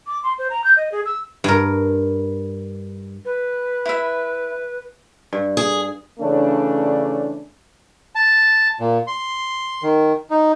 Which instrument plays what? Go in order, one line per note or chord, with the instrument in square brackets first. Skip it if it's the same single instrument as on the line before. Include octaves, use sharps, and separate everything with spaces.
[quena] D6
C6
C5
A#5
G6
D#5
G#4
E6
[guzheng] G2 A#4
[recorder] B4
[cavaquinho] E4 E5
[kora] G2
[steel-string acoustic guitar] G#4
[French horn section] C#3 E3 A3 C#4 D4
[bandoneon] A5
A#2
C6
D#3
D#4